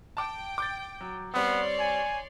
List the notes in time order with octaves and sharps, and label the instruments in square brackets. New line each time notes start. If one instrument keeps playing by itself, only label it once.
[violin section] G5 [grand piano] A5 D6
[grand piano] D6 G6 A6
F#3
[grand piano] G3 C4 [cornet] B3 [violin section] C#5 D5 C6
[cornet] G#5